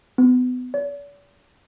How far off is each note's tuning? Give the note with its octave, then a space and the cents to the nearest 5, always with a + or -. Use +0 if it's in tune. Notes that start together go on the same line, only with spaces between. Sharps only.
B3 +30
D5 -45